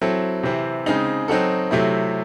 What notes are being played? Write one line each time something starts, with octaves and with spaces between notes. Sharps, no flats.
F#3 C4 E4 A4
C3 E3 C4 E4
C#3 G#3 C4 D#4
F#3 C4 D#4 F#4 A4
C3 F#3 A3 C4 E4